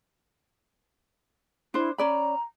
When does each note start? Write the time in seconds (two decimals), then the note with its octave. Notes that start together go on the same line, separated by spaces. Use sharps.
1.74 D4 E4 C5
1.98 C#4 D5 A#5 B5